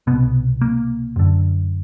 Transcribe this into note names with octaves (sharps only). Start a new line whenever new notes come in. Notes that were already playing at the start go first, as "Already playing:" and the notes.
C2 B2 B3
A#3
F#2 D3